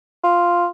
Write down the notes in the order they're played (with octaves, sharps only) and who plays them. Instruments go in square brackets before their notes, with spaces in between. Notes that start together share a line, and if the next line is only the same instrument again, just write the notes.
[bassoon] F4